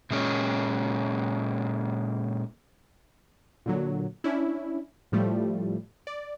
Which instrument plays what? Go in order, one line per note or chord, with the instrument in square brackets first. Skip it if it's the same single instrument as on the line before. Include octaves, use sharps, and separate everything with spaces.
[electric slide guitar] A#2 G#3 C#4
[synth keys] A#2 D3 F#3
C#4 D4 E4
A2 F3 G3 A3
D5